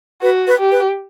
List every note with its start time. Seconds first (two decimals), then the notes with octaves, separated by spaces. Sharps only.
0.22 F#4 B4
0.47 B4
0.59 G4
0.72 B4